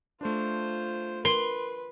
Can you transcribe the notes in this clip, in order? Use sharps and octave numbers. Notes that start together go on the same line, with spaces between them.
A3 D4 F4 C5
A#4 B4 C6